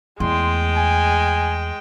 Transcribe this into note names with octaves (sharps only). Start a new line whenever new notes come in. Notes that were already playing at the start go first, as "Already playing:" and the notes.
E2 G#3 A3 G5 C6
G#5